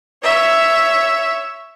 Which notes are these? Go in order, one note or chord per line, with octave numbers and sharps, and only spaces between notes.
C#5 E5